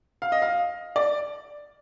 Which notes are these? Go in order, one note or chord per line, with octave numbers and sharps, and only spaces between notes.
F5
D#5
F5
D5